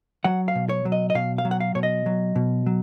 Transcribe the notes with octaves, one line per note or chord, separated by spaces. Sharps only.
F#3 F#5
F5
B2
C#5
F#3
D#5
D#5
B2 F5
F5
F#3
F#5
F5
B2 C#5
D#5
F#3
B2
F#3